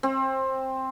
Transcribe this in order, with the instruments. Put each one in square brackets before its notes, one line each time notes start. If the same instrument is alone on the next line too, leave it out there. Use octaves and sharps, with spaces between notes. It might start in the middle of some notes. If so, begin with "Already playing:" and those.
[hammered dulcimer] C4